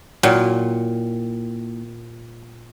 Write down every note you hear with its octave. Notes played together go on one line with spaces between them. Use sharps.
A#2 F#3 A#3 E4 G5